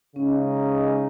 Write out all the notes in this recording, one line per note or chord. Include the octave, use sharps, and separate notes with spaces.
C#3 G#3 C#4 D#4 G#4